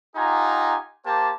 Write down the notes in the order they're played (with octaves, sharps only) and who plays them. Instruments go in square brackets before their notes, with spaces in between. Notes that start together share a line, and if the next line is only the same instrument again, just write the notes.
[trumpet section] D#4 F4 G4 F#5 G#5 A#5
A#3 G4 C5 A5